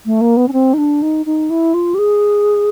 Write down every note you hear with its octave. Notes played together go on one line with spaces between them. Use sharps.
A3
A#3
B3
C#4
C4
D#4
D4
D#4
D#4
E4
F4
G4
G#4